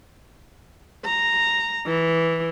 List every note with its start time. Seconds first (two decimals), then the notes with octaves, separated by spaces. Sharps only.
1.06 A#5
1.86 E3